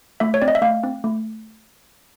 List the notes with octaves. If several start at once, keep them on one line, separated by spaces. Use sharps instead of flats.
A3 E5
C#5
C4 D5
D#5
E5
A3 F5
C4
A3